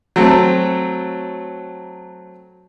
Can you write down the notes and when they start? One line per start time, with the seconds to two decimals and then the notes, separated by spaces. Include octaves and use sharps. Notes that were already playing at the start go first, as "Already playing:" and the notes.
0.16 F#3 A3 C4